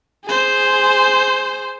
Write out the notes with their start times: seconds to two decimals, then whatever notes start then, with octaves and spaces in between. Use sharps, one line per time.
0.25 G#4 C5